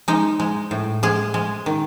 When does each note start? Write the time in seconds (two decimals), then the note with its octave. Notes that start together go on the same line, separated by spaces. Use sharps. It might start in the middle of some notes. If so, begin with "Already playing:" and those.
0.08 G#3 D#4
0.40 G#3
0.71 A2
1.03 G#3 G#4
1.34 G#3
1.66 D#3